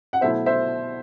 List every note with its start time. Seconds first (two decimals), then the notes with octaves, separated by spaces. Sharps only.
0.13 F#5
0.21 B2 F#3 A3 E4 C5 E5
0.46 C5 E5